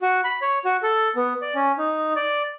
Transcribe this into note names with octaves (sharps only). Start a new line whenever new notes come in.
F#4
B5
C#5
F#4
A4
B3
D5
C#4
D#4
D5